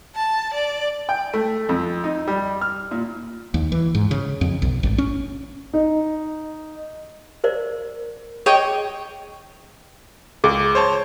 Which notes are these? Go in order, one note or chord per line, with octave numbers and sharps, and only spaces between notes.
A5
D5
G5
A3
F2
D#4
G3
F6
A#2
D#2
E3
G#2
C#3
F2
B1
G#1
C#4
D#4
A#4 C5 D5
G#4 C#5 D#5 G5
C#2 G#4
C5 C#5 A5